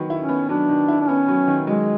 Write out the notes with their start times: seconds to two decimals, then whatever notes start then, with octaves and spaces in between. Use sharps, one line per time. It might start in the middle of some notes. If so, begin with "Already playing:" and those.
Already playing: D#3 F#3 B3
0.10 E4
0.19 C#4
0.29 B3
0.49 F#3 D4
0.69 D#3
0.88 E4
1.01 D4
1.08 B3 C#4
1.28 F#3
1.48 D#3
1.67 F#3 G#3